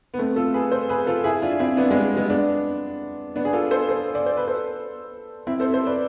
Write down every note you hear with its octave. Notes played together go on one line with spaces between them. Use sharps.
B3
A3 C4
F4 A4
G#4 B4
A4 C5
G#4 B4
F4 A4
E4 G#4
D4 F4
C4 E4
B3 D4
G#3 B3
G#3 B3
B3 D4
B3 D4
G#4
F4 A4
A4 C5
A4 C5
D5
C5
B4
A4 C5
C4 E4
A4 C5
A4 C5
B4 D5